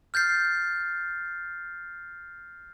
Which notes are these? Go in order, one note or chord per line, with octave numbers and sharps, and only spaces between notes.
F6 G6 A6 C7